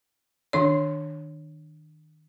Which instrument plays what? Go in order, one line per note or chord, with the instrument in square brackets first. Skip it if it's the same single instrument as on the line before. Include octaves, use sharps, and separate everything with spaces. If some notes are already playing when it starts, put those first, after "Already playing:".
[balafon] D#3 D4 C#5